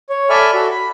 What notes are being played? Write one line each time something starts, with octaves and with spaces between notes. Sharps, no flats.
C#5
A4 D5 E5 G#5 B5 F6
F#4 A4
B5